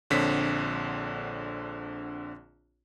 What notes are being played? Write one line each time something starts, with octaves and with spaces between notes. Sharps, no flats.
A#1 D3 C4 C#5 B6